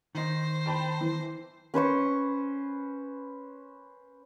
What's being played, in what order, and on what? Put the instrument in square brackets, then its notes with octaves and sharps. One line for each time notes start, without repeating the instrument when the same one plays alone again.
[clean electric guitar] D#3 D#4 [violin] C5
[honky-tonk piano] G5 A5 B5
E3
[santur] C#4 B4 C5 C#6